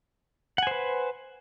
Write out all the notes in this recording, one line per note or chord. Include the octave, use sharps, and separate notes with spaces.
B4 C5 F#5 G#5